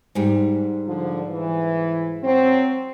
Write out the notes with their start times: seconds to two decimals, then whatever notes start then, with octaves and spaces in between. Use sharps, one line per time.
0.15 G#2 G3
0.86 D3 F3
1.31 E3
2.23 F#3 C4